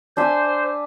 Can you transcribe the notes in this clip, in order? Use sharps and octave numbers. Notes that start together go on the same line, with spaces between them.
D4 C5 E5 G#5